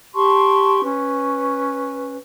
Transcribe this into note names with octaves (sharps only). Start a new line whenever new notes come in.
G4 A5 C6 C#6
C#4 B4